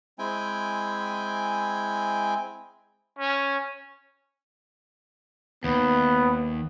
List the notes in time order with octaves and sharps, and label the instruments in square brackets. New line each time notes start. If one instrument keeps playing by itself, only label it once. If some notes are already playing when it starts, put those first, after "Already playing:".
[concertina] G#3 C4 E4 G5 G#5
[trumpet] C#4
[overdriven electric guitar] D#2 [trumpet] B3